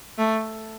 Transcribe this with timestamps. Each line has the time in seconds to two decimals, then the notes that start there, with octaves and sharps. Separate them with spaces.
0.18 A3